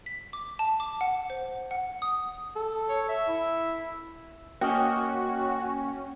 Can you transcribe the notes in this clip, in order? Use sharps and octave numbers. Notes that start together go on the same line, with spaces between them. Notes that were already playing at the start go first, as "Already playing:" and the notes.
B6
D6
A5
D6
F#5
C5
F#5
D#6
A4
C#5
E5
E4
A#3 C#4 F#4 D#5 G5